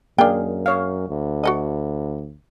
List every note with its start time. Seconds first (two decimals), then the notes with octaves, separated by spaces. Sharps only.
0.18 F#2 A#3 D4 G#4 F5 G5
0.66 C#5 F5
1.08 D2
1.44 F#4 A4 D#5